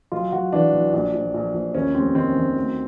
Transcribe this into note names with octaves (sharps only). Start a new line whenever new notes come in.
B1 F4
B1 F#4
E3 D4
B1
A#1 D4
A#1
A#1
A#1
D#2 C#4
F1 C4
D#3 C4
D#3
D2